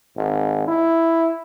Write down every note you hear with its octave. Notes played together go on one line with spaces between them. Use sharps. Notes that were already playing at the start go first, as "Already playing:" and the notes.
G#1
E4